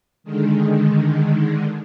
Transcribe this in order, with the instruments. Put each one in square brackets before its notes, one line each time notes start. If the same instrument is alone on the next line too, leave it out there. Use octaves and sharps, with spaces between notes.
[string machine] D3 D#3 G#3